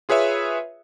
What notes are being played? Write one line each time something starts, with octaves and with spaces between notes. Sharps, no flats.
F4 G#4 B4 C#5 E5